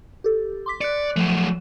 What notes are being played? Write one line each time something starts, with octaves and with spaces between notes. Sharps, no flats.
G4 A4
C6 D6 B6
D5 F#6 C#7
F3 F#3 A3